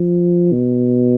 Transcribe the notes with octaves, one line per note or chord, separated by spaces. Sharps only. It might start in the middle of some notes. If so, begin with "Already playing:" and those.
Already playing: F3
B2